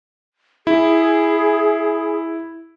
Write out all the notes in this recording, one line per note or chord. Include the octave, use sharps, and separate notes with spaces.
E4 G#4